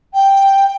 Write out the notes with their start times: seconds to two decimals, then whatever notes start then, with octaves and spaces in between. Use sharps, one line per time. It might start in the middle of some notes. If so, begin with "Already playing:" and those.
0.13 G5